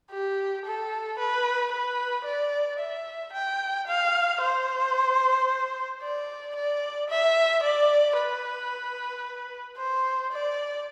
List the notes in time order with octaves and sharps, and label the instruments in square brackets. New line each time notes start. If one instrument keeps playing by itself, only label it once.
[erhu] G4
A4
B4
B4
D5
E5
G5
F5
C5
D5
D5
E5
D5
B4
C5
D5